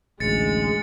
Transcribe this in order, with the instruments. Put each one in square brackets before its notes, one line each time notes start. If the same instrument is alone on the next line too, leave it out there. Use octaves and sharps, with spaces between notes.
[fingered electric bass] A1 D2 [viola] G#3 [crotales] A6 C#7